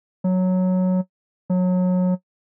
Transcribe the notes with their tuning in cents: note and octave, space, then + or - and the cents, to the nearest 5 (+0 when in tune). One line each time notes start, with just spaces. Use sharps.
F#3 -5
F#3 -25